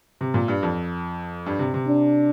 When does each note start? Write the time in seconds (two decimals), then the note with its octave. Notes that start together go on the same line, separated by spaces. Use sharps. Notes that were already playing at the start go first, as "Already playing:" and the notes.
0.21 C3
0.34 A#2
0.48 G2
0.63 F2
1.46 G2
1.59 C3
1.74 C3
1.87 D4